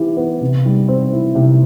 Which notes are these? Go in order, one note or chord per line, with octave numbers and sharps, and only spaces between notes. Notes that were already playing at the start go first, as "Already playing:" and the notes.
Already playing: E3 B3 G4
B3
C3
G3
C4
E4
C3